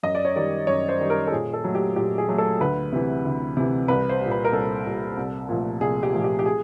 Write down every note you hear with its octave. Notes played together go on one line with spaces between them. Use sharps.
F#2 D#5
D5
C#5
D#3 G3 D5
F#2 C#5
C5
D#3 G3
A#4
A4
A#2 G#4
A4
F#3 A3
G4
A#2 G4
G#4
F#3 A3
A4
D2 B4
C3 E3
D2
C3 E3
C2 B4
C5
A#2 G3
B4
A#4
C2 A4
A#2 G3
C2
A#2 F3 A3
C2 G#4
G4
A#2 F3 A3
G4
G4
G#4